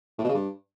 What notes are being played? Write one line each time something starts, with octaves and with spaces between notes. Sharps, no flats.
A2
B2
C#3
G2